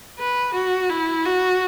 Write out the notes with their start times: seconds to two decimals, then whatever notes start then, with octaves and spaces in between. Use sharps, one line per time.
0.20 B4
0.54 F#4
0.90 E4
1.25 F#4